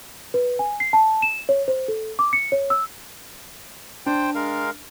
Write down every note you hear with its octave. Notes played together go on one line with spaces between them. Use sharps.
B4
G#5
C7
A5
E7
C#5
C5
A4
D6
C#7
C#5
E6
D4 C5 G5
G#3 A#4 F5